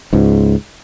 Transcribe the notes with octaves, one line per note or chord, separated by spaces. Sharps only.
C#2 G#2